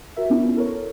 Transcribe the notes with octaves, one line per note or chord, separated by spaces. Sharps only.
F#4 A#4 E5
B3 C#4 D4 E4 F4
A4 A#4 C#5